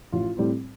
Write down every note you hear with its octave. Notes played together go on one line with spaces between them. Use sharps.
A1 F4
A2 G3 C4